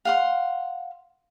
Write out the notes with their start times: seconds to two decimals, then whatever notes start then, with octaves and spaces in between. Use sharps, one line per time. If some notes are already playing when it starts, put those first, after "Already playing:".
0.05 F5 F#5 C6